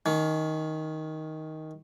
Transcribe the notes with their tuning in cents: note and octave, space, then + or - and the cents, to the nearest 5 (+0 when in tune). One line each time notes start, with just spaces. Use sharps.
D#3 +10 C#4 +35